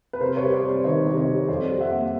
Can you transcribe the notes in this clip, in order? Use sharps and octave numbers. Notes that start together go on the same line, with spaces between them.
B4
C3 A#4 C5
B4 C#5
G3
C5 D5
C3
A#4 C5
D#3 C#5 D#5
C3
C#5 D#5
G3
F2 C5 D5
G3
E5 F#5
A#3